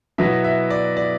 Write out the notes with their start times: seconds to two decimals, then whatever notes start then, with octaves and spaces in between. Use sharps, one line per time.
0.18 B2 F#3 B3 E4 E5
0.44 E5
0.70 D5
0.97 D5